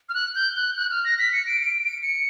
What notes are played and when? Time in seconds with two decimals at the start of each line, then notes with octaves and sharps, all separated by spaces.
0.09 F6
0.14 F#6
0.35 G6
0.56 F#6
0.77 F#6
0.91 F6
1.05 A#6
1.19 B6
1.33 C#7
1.47 D7
1.61 D7
1.85 D7
2.03 C#7